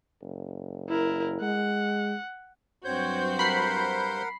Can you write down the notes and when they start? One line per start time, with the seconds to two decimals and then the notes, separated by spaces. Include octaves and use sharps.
0.22 F#1
0.89 E4 A#4
1.41 G#3 F#5
2.84 G2 F#3 C4 F#4 C5 C#5 G6
3.39 A#4 F#5 B5 C7